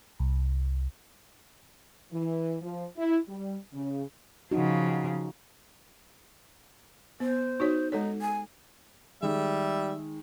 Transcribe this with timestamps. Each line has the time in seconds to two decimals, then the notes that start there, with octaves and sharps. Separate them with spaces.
0.20 C2
2.12 E3
2.62 F3
2.97 E4
3.28 G3
3.73 C#3
4.51 C#3 F3 D#4 F#4
7.20 B3 C5
7.60 D#4 F#4 C#5
7.92 G#3 D#4 A4 C#5
8.22 G#5
9.22 D#3 G3 G#3 E5